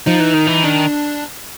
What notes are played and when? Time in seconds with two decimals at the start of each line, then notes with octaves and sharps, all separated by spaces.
0.06 F3 D#4
0.20 E3
0.34 D#3
0.47 E3
0.64 D#3 D4